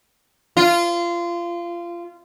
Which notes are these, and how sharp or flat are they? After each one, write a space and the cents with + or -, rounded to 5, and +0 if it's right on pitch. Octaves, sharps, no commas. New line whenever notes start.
F4 -20